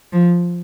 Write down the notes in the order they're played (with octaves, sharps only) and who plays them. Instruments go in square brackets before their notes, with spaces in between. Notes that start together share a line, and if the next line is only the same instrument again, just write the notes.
[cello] F3